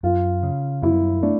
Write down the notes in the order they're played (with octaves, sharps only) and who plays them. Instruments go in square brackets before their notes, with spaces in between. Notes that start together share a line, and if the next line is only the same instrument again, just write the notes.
[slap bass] F#2 [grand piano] F4
[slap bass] C#3
[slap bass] F#2 [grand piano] E4
[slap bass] A3 [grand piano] D4